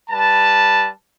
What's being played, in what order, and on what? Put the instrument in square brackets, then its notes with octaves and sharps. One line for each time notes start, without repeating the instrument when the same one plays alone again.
[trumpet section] G3 B4 A5